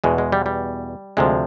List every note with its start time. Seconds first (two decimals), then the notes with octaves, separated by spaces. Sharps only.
0.04 E2 B2 G#3
0.18 G#3
0.32 G3
0.46 G3
1.17 D2 C3 F3 G#3